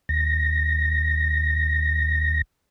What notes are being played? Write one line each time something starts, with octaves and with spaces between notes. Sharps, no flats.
D#2 A#6